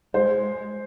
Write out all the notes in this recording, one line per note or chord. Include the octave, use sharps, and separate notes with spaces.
G#3 C5